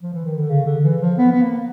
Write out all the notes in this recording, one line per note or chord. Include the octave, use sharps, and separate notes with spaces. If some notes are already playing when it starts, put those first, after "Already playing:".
F3
E3
D#3
D3
C#3
D3
E3
F3
B3
B3
A#3